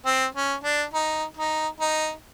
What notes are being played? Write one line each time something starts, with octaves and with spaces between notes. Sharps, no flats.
C4
C#4
D4
D#4
D#4
D#4